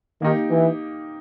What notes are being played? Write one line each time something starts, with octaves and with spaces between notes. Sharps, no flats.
D#3 A#3 D#4 G4
E3